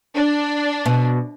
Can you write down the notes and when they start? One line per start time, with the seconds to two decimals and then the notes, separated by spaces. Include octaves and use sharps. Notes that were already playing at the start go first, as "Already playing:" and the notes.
0.15 D4
0.86 B2